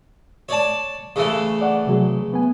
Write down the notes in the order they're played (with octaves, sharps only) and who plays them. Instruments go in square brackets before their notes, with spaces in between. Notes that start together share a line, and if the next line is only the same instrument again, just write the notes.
[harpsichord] C#5 D5 A5
C#3 E3 A3
[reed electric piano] D5 F#5
C3 F#3 G#4
B3 G#5